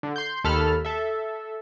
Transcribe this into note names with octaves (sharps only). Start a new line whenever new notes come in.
D3
C6 G6
D#2 A4 A5 B5 F6
A4 E5